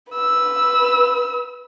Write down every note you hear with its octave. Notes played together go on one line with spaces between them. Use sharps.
B4 E6